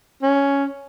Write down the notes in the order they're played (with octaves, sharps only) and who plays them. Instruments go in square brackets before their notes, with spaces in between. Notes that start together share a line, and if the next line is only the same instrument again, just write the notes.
[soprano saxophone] C#4